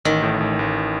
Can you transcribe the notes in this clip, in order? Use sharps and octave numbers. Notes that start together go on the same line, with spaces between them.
A1 D#3
A2
A1
A1